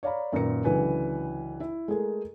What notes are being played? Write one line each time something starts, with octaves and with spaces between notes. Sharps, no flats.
C#5 D5 F5 A#5 B5
F#2 A#2 D#3 B4 A#5 C#7
C#2 D3 E3 F#3 B4 G#5
E4
G#3 A3 G#4 A#4